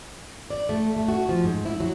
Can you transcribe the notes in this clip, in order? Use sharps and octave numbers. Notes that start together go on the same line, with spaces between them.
D5
A3
A3
F#4
F3
G#2
E4
F#3